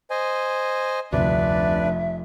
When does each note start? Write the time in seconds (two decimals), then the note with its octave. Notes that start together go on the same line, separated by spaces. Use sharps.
0.10 C5 D#5 G#5
1.12 F1 D2 G2 C3 D4 B4 D5 E5